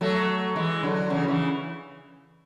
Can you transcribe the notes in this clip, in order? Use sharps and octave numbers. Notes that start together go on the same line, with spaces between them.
F#3 A3
E3 G#3
D3 F#3
C#3 E3
F#3
C#3 E3